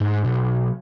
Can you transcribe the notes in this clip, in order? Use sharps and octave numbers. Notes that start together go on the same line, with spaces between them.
G#2
B1